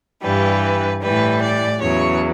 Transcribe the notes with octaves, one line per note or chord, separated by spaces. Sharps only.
G2 E3 G3 B4
A2 E3 G3 B4
D5
E2 C#3 F#3 C#5